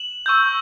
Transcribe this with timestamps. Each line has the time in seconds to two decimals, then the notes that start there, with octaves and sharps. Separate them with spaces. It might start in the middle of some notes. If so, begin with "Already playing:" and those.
Already playing: E7 F#7
0.26 C#6 E6 G6